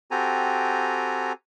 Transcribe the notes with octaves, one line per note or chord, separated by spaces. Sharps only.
C4 F#4 G4 A4 G#5 A#5